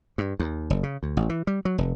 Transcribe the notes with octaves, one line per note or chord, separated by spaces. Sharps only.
G2
D#2
F#1
C#3
D2
A1
E3
G3
F#3
F1